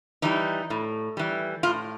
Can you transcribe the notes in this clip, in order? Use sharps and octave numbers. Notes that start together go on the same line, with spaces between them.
E3 G3 D#4
A2
E3 G3
A2 F4